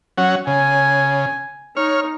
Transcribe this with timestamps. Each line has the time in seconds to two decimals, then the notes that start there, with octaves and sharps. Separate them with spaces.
0.18 F#3 C#4 F#5
0.47 C#3 G#5
1.77 D#4 C#5 F6